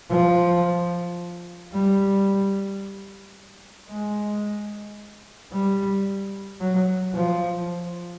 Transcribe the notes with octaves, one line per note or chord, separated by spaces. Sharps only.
F3
G3
G#3
G3
F#3
F3